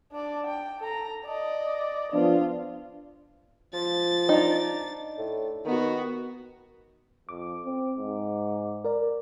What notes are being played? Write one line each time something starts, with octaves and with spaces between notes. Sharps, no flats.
D4 D5
G5
A4 A#5
D5 D#5
F3 B3 D4 F4
F3 A6
D4 D#4
A2
D#3 B3 F#4
F2 D6
C4
G#2
A#4 D5